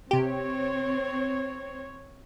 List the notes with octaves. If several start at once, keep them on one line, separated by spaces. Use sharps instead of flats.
C3 C4 G4 C#5